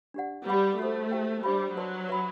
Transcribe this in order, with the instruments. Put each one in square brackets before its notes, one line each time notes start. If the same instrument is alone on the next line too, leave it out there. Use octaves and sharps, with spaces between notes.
[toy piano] D4 G4 D5 F#5
[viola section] G3 [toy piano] G4 B4 F#5 B5
[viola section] A3 [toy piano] F#4 A4 C5
[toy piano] E4 G4 C5 E5 G5
[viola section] G3 [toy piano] D4 G4 C5 E5 B5
[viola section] F#3 [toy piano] B4 D5 A5 C6
[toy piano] B4 E5 B5